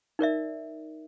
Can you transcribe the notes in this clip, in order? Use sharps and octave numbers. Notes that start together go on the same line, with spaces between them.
D#4 A#4 D5 E5